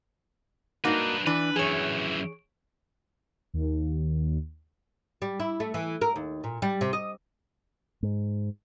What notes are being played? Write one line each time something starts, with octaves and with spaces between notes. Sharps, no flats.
A#3 D4 D#4 F#4 B4
E3 D4 B4
F#2 E3 G#4 C#5
D#2
G3
E4
A3
E3
A#4
D#2
A#2
G3
C3
D#5
G#2